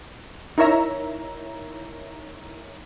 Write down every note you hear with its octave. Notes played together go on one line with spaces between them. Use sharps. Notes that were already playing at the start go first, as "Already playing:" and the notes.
D#4 E4 A#4 C#5 E5 A#5